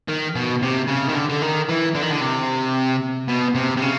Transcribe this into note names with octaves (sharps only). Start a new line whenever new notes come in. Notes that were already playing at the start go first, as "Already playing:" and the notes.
D#3
B2
C3
C#3
D#3
D3
D3
D#3
E3
D3
D#3
D3
C3
B2
C3
C3
C#3